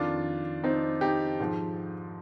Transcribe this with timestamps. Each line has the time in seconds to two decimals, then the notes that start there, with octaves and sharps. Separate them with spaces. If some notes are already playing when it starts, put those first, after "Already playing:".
Already playing: F2 D#3 D4 F4
0.64 C4 D#4
1.01 D#4 G4
1.40 G#2 F3